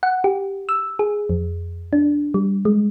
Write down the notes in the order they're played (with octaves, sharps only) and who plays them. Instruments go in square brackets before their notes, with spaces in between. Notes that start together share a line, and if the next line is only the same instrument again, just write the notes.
[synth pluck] F#5
G4
E6
G#4
F2
D4
G3
G#3